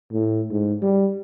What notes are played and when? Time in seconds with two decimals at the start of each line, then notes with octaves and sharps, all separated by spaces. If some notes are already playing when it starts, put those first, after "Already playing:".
0.12 A2
0.51 G#2
0.82 G3